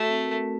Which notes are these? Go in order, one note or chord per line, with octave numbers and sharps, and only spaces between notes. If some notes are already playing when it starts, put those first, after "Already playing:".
Already playing: A3 F#4
C4
A#4
A3